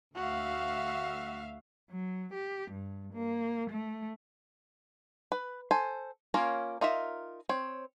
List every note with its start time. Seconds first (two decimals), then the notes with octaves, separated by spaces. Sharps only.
0.15 D2 F#4 E5 F5
1.90 F#3
2.33 G4
2.71 G2
3.14 A#3
3.70 A3
5.32 B4
5.71 A4 C5 G#5
6.34 A#3 C#4 F4 A#4 C#5
6.81 D#4 F4 A#4 E5
7.49 C4 C#5